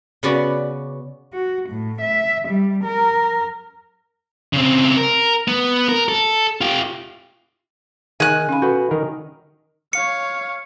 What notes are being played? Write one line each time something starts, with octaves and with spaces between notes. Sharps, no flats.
C#3 B3 C#4 F#4 B4 D5
F#4
A2
E5
G3
A#4
C#3 C4
A#4
B3
A#4
A4
F4 G4
D#3 G#4 G#5 F#6
C#4 F5 B5
F#4 A4 B4
D#3 A#4
C#5 F5 C#7